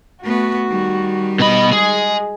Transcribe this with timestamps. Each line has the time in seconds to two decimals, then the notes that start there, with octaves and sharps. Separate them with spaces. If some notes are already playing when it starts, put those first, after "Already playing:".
0.24 A3 B3 F#4
0.69 D#3 G3
1.39 B2 D#5 B5
1.73 G#3 G#4